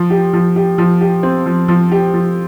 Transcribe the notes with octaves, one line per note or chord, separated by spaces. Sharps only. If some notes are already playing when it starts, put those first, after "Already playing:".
Already playing: F3
G4
F3
G4
F3
G4
C4
F3
F3
G4
F3